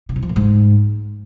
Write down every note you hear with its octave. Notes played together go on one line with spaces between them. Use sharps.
C#3
C3
F3
A#2
G#2